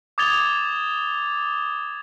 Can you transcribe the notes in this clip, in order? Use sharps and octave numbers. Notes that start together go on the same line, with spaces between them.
D6 D#6 G#6 A6 F7 G7